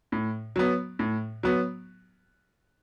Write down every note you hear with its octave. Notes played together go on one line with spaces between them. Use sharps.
A2
F#3 B3
A2
F#3 B3